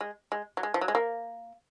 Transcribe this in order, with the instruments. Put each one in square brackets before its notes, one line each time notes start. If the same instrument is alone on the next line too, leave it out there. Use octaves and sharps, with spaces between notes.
[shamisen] G#3
G#3
F#3
G#3
F3
F#3
G#3
A#3